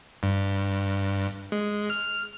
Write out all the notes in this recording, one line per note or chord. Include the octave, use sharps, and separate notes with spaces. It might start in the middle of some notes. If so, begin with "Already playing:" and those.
G2
G#3
F6